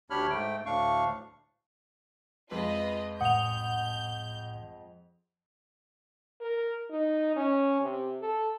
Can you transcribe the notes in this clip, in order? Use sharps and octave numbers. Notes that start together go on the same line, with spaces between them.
D2 D4 G4 C#5 B5 F6
G#2 A3 G5
D2 A2 D4 F5 C#6
F2 G#3 F4 B4 D#5
C2 A2 F#5 D#6 G6 F7
A#4
D#4
C#4
C3
A4